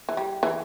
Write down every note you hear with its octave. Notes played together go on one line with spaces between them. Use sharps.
E3
G3
E3